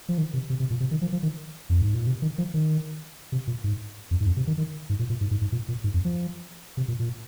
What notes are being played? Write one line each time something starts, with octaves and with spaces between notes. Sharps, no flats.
F3
D#3
C3
C3
C3
A#2
C3
D#3
F3
F3
D#3
F2
G#2
A#2
C3
D#3
F3
D#3
C3
A#2
G#2
F2
G#2
F2
C3
D#3
D#3
G#2
A#2
A#2
G#2
G#2
G#2
A#2
A#2
G#2
F2
F3
C3
A#2
A#2